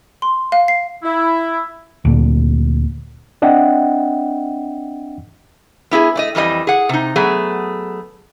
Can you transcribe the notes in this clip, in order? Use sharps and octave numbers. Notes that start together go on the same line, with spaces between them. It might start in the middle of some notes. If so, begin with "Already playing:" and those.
C6
F5
C7
E4
D2 A#2
C4 D4 D#5 E5 F#5 G5
B3 E4 F4 G#4
A3 D5 D#5
F2 E3 G3 D#5
G#4 F#5
C3 D#4
F#3 A3 B3 G#4